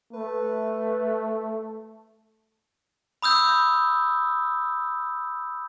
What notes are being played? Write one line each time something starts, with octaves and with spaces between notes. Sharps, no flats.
A3 B4
B5 D#6 E6 G6